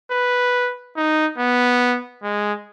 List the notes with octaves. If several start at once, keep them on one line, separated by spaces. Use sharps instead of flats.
B4
D#4
B3
G#3